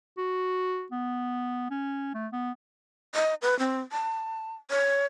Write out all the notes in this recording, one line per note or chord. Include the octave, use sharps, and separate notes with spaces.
F#4
B3
C#4
A3
B3
D#5
B4
C4
A5
C#5